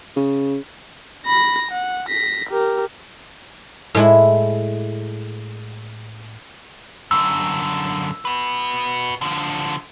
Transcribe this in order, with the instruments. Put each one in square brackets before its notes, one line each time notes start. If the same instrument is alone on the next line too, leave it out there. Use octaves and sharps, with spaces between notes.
[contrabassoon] C#3
[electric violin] B5 A#6
F#5
A#6 B6
G4 A#4
[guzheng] A2 G#3 E4
[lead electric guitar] F#2 D3 [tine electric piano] E6
[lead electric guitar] F#4 B4
D3 F3